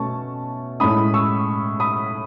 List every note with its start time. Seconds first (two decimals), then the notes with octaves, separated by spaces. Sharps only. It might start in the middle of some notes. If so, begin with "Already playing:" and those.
Already playing: B2 A3 C#4 A5 C#6
0.80 A2 G#3 C#4 B5 D#6
1.14 C#6 E6
1.80 B5 D#6